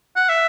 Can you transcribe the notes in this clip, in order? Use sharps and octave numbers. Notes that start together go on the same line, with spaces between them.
F#5
E5